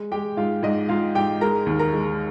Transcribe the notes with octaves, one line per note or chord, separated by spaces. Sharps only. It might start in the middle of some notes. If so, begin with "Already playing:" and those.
Already playing: G#3
G#3 G4 G5
G#2 F4 F5
G#2 D#5
G#2 F4 F5
G#2 G4 G5
G#3 A#4 A#5
D#2
A#4 A#5
G#3